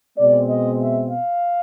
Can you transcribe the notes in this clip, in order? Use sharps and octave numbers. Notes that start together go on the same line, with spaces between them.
B2 G#3 C4 D5
D#5
E5
F5